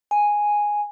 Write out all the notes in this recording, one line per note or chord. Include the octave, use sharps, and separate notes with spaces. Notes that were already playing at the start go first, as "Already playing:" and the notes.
G#5